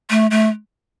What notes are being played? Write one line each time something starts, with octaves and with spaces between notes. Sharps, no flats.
A3
A3